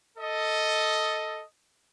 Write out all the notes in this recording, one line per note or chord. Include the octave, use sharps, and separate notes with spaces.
A4 D#5